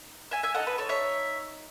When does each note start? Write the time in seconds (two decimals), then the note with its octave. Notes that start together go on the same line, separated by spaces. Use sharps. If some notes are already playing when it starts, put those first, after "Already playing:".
Already playing: D#4
0.31 E5 G#5
0.43 E5 G#5
0.54 A4 D#5 F#5
0.59 D#4
0.67 B4
0.78 A4 C#5
0.89 C#5 E5